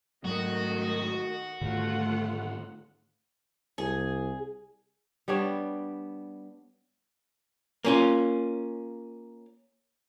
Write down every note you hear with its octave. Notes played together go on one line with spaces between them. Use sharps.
G#2 D#3 F#3 G#3 A3 F#4 D#5
G#2 D3 D#3 A3 F4 F#5
C2 G#4
G3 B3 D4 C#5
A#3 C#4 F4